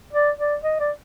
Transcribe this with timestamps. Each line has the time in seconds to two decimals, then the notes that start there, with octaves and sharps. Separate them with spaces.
0.13 D5
0.38 D5
0.63 D#5
0.80 D5